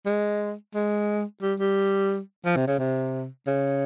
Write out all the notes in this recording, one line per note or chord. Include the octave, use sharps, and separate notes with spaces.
G#3
G#3
G3
G3
F3
C3
C#3
C3
C#3